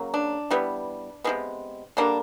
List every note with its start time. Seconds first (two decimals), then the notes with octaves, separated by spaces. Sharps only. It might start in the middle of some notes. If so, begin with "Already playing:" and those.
Already playing: C#3 F#3 A#3
0.14 D4
0.51 E3 G3 B3
1.24 C3 F3 G#3 B3
1.97 D3 G3 A#3 D4